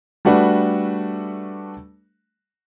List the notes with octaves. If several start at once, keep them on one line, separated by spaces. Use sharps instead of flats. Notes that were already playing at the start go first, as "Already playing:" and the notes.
G3 A3 D4 F#4 B4